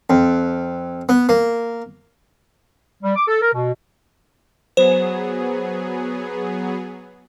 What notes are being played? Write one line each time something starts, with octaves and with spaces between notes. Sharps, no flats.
F2
B3
A#3
G3
D6
A4
A#4
B2
F#3 B3 G#4 C5